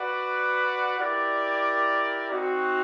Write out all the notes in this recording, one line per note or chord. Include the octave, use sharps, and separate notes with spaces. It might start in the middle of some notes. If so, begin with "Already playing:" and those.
Already playing: F#4 B4 D5 F#5
E4 G4 A#4 D5
C4 D#4 F#4